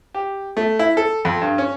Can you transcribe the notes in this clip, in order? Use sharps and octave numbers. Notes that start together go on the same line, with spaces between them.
G4
A3
E4
A4
F2
G2
C#4